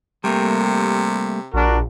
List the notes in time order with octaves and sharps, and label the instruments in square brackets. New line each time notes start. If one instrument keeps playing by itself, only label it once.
[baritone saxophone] C3 [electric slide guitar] G3 A3 A#3
[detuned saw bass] A#1 [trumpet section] D4 F#4 A#4